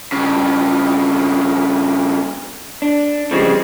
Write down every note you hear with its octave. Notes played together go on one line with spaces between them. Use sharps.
G2 C#3
D4
C#3 F3 G3 G#3 C4